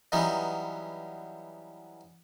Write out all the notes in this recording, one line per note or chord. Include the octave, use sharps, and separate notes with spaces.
E3 F#3 G3 B3 C#4 D#4